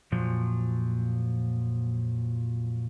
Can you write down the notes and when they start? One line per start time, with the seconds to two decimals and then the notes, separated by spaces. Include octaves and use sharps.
0.12 F2 A#2 F3 F#3